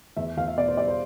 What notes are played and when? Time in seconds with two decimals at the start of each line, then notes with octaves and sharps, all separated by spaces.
0.17 E2 E5
0.37 E2 F5
0.48 E5
0.58 B2 D5
0.68 C5
0.77 G3 D5
0.88 C5